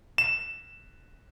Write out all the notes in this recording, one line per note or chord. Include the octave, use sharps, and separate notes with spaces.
E7